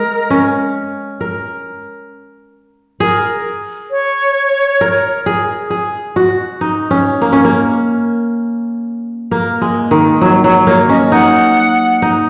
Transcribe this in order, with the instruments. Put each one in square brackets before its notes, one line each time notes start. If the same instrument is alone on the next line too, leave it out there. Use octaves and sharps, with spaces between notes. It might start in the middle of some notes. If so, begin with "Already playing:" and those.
Already playing: [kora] G#3 [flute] A#4
[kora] C#4
A#4
[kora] G#4 [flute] A#4
[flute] C#5
[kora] A#4
G#4
G#4
F#4
D#4
C#4
A#3
C#4
A#3
[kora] A#3 [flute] A#4
[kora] G#3
D#3
[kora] F#3 [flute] C#5
[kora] F#3 [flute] C#5
[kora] A#3 [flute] C#5
[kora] C#4 [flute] D#5
[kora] D#4 [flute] F#5
[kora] D#4